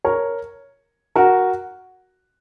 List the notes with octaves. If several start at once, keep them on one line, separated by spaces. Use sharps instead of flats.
A#4 C#5
F#4 A#4